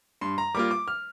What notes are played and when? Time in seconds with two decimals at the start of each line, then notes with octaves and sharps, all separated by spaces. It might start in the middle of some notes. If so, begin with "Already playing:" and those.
0.21 G2 C6
0.38 A#5
0.54 G3 A#3 F4 D6
0.71 D6
0.88 F6